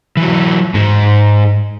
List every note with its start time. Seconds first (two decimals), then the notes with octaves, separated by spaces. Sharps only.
0.17 E3 F#3
0.74 G#2 G#3